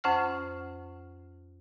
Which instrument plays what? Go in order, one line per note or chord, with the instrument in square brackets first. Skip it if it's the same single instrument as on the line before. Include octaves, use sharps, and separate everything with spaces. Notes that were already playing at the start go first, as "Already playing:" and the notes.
[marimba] F2 C#4 C5 F#5 F6